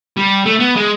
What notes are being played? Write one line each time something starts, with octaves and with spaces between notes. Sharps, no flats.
G3
A3
B3
G#3